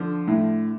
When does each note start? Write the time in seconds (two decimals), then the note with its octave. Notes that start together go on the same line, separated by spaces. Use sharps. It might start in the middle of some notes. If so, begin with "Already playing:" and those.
Already playing: D3 F3
0.27 A2